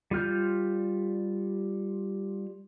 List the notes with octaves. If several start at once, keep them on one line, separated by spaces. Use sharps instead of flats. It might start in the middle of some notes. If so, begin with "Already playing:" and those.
G3 F4 F6 G6